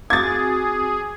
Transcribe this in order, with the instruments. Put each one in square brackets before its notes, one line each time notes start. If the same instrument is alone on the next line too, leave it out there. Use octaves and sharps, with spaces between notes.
[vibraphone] C4 F#4 [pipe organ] G#4 [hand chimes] D6 D#6 [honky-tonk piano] G#6 A6